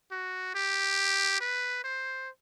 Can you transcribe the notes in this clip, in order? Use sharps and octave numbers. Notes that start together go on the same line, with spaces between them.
F#4
G4
B4
C5